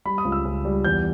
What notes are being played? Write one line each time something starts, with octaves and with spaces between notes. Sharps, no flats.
G3 B5
D#6
C#2
E6
C#2
G3
E2 G6